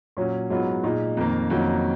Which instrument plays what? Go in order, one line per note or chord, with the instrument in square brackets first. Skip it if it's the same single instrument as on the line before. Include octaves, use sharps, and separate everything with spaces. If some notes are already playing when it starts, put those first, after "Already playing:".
[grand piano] A#2 F#3 C#4
G#2 F#3 B3 F4
A#2 G#3 D#4
F2 D#3 A#3
F2 D#3 F#3 A#3 C#4